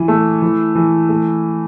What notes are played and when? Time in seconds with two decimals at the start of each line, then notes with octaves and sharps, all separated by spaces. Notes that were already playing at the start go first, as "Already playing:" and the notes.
Already playing: E3
0.08 A3
0.42 E3
0.75 E3
1.09 A3